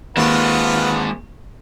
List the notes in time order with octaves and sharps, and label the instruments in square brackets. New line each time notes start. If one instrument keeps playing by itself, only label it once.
[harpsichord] D#2 A5 [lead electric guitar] G#3 C4 [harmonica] F4 B4 F#5